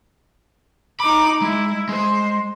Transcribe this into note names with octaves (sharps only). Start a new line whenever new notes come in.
D#4 B5 D6
G#3 E4
G#3 C5